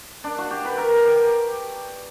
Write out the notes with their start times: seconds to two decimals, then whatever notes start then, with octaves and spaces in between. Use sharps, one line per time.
0.24 D4
0.38 F#4
0.51 G4
0.65 B4
0.78 A#4
1.05 G4